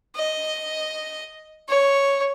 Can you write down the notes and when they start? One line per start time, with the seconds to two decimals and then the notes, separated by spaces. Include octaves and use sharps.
0.16 D#5
1.69 C#5